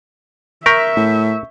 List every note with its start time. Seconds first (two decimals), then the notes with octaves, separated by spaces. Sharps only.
0.66 A#4 E5 C#6 G6 B6
0.96 A2